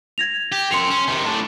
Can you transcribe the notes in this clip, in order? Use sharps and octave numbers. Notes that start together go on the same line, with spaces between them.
G#6 A#6 F7
G4
F#2 C4 C6 C#7 F7
C#4
C3 D#3
A2 D4